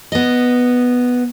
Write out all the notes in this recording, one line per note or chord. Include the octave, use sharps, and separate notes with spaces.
B3 D#5